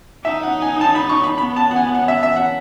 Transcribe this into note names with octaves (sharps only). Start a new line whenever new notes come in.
D#4 E5
F#5
G#5
A5
B5
C#6
B5
B3 B5
A5
F#5
G#5
F#5
E5
E5
F#5